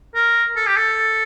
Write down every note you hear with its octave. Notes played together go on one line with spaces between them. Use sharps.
A#4
A4
G4
A4